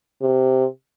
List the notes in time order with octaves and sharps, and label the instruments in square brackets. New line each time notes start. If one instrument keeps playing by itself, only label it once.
[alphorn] C3